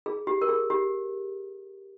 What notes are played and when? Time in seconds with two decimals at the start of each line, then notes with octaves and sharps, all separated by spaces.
0.06 G#4
0.27 G4
0.42 A#4
0.49 G#4
0.70 G4